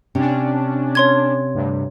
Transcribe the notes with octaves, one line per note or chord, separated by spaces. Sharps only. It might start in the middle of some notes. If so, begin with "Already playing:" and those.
C3 C#4 D4
C#5 C6 G#6
D2 G2 C3